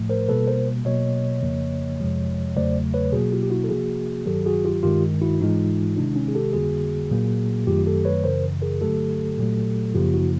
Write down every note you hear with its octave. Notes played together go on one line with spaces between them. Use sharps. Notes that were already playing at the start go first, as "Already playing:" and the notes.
Already playing: A2 F3 A3
A#4 C5
B2 G3 A#3 A4 B4
A#4 C5
B2 F#3 A#3 C#5 D#5
F2 C#3 F3 A#3
F2 C3 F3 G#3
E2 C#3 F#3 A3 C5 D5
B4 C#5
B2 F#3 A#3 F#4 G#4
F4 G4
G4
E4 F#4
A4
C3 F3 A#3 F#4 G#4
G2 D#3 F#3 G4 A4
F#4 G#4
F4 G4
G2 D#3 G#3 F4 G4
E4 F#4
G#2 E3 G#3 D#4 F4
C3 D#3 G#3 D4 E4
C#4 D#4
G#4
G4 A4
F2 D3 G3 A#3 F#4 G#4
A#2 F#3 A#3
F#2 D#3 F#3 A3 F4 G4
G4 A4
B4 C#5
F#2 C#3 E3 A#4 C5
G#4 A#4
G2 D3 F#3 A3 G4 A4
A#2 F#3 A3
F#2 C#3 F3 A#3 F4 G4
E4 F#4